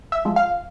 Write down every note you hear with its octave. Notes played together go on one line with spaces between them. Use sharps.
E5
F3 G#3
F5